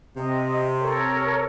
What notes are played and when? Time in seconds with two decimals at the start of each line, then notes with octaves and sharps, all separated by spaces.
0.17 C3 D#5
0.81 A4 A#4 C#5